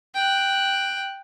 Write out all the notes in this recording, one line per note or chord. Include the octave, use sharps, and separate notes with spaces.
G5 F#6